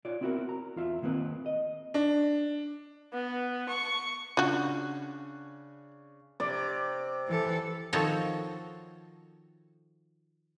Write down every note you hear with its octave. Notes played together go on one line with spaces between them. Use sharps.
F4 C#5 D5
B3 C4 E4 F#4 G#4 A#4
A#5
E2 F4 E5
D#3 A#3 C4 B4
D#5
D4
B3
C#6
C#3 D4 F4 F#4 F#6
C3 D5
E3 A4
D#3 F3 C4 F#4 A4 C#5